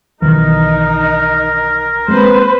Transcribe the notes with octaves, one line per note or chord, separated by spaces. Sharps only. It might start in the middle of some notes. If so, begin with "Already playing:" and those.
B1 D#3 E3 D#4 A#4
G#3 A#3 C4 B4 C5